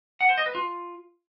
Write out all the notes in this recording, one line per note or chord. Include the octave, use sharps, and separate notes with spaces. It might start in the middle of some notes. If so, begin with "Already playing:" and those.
F#5
C5
D#5
B4
F4